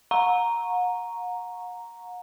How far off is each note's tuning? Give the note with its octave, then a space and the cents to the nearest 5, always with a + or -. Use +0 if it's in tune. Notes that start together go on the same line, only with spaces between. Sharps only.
F#5 -40 A#5 +0 C#6 -10